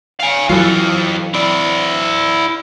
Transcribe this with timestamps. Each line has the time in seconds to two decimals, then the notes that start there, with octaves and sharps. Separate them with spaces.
0.20 F5 G#5
0.50 E3 F#3 F4 A4
1.34 E4 D5